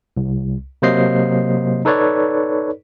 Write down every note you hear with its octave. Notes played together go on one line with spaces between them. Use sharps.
C2
C3 F#3 A#3 C5 D#5 C7
D#4 A4 B4 C#5 D5